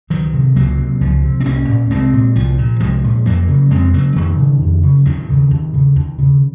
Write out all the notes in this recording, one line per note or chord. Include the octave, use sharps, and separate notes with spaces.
C#2 D#3 F#3
C3
C#2 F#3 A#3
C3
C#2 F3
C3
C4
C2 A#3 C#4
A#2
C2 G#3 C4
A#2
C2 F3
A#2
C2 F3 G#3
A#2
F2 F#3 A#3
C#3
F2 G#3 C4
C#3 F#3 A#3
F2 D#3 F#3
C#3
F2
C#3
D#2 D#3 F#3
C#3
D#2
C#3
D#2
C#3